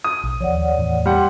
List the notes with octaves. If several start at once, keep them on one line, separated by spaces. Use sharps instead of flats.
D#6
B1
D#2 F3 C#5 D5 F#5
E2 A2 E3
G3 F#5 C6